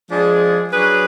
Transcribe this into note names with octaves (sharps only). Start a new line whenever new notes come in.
F3 G#3 D4 G#4
F#3 D4 G#4 B4